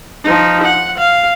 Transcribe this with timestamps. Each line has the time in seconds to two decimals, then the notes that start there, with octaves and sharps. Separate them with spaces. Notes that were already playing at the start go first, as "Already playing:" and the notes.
0.24 F3 D#4
0.63 F#5
0.98 F5